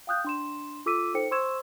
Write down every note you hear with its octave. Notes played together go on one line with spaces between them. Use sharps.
F5 G5 D#6 F#6 G6
D4 C6 E7
F4 A4 D6 E6 B6 D#7
D#4 A4 C5 G5 C#7
C5 C6 C#6 E6 G#6 E7